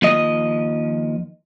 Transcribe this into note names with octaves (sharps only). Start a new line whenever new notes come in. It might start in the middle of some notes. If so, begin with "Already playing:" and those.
D#2 F3 D#5